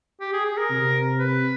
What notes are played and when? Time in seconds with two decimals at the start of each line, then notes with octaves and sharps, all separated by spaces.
0.21 G4
0.33 G#4
0.46 G#4
0.58 A#4
0.70 C3
1.19 B4